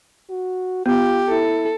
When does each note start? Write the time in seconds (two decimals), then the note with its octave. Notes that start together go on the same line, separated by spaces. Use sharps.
0.29 F#4
0.86 B3 F4 G4
1.29 E4 A4